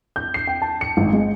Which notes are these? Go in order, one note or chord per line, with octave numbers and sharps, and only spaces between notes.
G6
C7
G5
A5
C#7
G#1
G#3